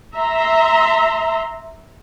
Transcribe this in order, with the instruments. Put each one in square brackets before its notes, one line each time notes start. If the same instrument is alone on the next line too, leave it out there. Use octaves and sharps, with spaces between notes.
[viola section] E5 A#5 C6